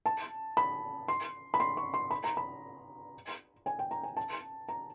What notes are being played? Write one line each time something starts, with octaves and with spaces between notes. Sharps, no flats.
A5
B5
C6
B5
C6
C#6
C6
B5
A#5
B5
G#5
G5
A#5
G#5
A5
A#5